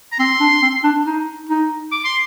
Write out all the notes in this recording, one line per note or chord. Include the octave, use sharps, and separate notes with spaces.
A#5
C4 C6
D4
C4
D4
D#4
D#4
D6
C6